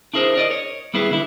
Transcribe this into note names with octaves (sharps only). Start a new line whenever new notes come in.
D4 E4 G#4 A#4 C5
A#4 D5 D#5
C#5
G3 B3 E4 G#4 B4
D3 E4